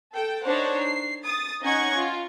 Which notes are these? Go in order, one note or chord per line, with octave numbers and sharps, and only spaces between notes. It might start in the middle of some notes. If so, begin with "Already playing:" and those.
A4 G5
D4 D#4 C5 C#5 F#5
C7
D#6 A6
C#4 D#4 D#5 F#5 C#6 G#6
F4